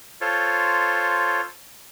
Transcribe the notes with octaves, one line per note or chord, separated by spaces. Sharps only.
F4 A4 C5 C#5